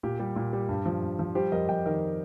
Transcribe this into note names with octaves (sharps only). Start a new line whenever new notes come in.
A#2 G4
G3
A#2
G3
G2
F3
G2
F3
G3 G4 C5
F2 A#4 D#5
F2 D#5 G5
D#3 A#4 D#5